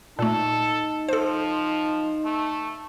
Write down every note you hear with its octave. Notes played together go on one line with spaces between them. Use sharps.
A#2 A3 D#4 A4
F3 A4 C5
A3